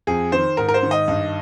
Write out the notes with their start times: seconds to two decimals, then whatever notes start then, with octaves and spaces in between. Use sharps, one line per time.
0.07 F2 G#4
0.32 D#3 C5
0.57 G#2 A#4
0.69 A#4
0.74 C5
0.83 D#3
0.91 D#5
1.08 G2